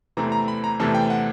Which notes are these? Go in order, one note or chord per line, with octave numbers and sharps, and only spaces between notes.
E2 C3 E3 A3 C4 A#5
A#5
B5
A#5
E2 C3 E3 A3 C4 A5
G5
F#5